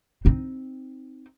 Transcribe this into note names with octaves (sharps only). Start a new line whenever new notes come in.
C4 D#4